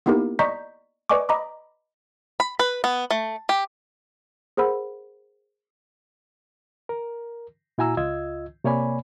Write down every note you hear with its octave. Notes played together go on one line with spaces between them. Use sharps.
A#3 B3 D#4 E4 G4 A#4
D5 D#5 A#5 C#6 G6 B6
B4 D5 D#5 G#5 C#6 D6
D#5 A#5 B5 D6
B5
B4
B3
A3
G4
G#4 A#4 C5 F#5 B5 E6
A#4
A#2 E4 F#4 G#5 A#5 E6
C#2 F4 D#5 E6 G#6
C3 A#3 C#5 D5 G#5 B5